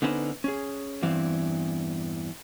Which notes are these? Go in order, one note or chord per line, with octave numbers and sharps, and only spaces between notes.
D3 B3 C#4 D#4 B4 C5
C#4 G#4
E2 G2 E3 C4 F5